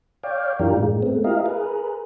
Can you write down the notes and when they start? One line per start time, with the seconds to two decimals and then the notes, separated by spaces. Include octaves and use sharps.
0.23 C#5 D5 F5 G5
0.59 F#2 E3 D4 F4 G4 A#4
0.77 A2 G#3
1.02 G#3 A3 B3 C4
1.24 E4 F4 G4 A#4 D#5 F5
1.46 G#4 A#4 B4